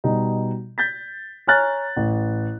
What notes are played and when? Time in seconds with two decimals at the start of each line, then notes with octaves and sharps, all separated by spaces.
0.04 B2 G3 D#4
0.78 G6 A6 B6
1.47 C#5 G#5 A#5 F6 F#6 A6
1.97 A1